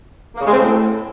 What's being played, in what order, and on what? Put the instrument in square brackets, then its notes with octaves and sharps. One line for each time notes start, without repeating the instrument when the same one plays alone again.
[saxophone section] A#3
C#3
G#3
C4
A2